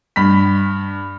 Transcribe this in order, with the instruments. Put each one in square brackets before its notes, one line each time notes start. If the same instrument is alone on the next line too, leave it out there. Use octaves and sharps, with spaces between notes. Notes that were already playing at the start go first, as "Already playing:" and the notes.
[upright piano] G2 B5 B6